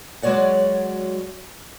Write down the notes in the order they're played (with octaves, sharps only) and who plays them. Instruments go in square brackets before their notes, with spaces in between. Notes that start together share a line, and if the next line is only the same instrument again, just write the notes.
[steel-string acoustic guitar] F#3 G#3 F#4 C#5 D5 F#5